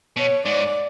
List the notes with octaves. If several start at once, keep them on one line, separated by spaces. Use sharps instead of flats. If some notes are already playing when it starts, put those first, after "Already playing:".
B2 C#5
G#2 D5